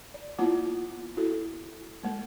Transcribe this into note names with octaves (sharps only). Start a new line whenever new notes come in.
D5
A#3 B3 E4 F4 F#5 D6
E4 F#4 A4
G#3 A#3